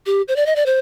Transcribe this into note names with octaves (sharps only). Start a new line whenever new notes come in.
G4
C5
D5
D#5
D5
C5